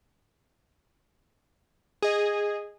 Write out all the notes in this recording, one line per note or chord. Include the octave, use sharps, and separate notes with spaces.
G#4 D#5